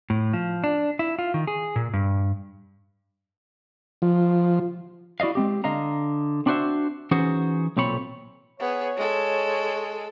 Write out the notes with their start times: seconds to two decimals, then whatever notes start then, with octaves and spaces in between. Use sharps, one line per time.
0.10 A2
0.33 F3
0.64 D4
0.99 E4
1.19 F4
1.34 D#3
1.47 G#4
1.76 A#2
1.93 G2
4.02 F3
5.20 E4 F#4 D5 D#5 F5
5.35 G#3 C4 G4
5.64 D3 D#5 F5 A#5
6.46 C4 D4 E4 F#4 C5 E5
7.11 E3 C#4 D#4 F#4 G#4 C5
7.77 B1 A#2 C4 A4 C#5 B5
8.60 B3 G#4 C#5
8.97 G#3 A4